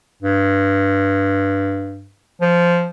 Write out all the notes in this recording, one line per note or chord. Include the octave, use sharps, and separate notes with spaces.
G2
F3